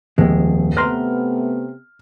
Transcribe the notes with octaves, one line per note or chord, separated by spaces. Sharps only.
D#1 F2 G#3
C3 A3 B3 B4 A#5 C6 F6